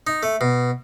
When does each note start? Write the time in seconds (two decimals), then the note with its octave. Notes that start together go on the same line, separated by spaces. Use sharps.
0.07 D#4
0.23 A3
0.41 B2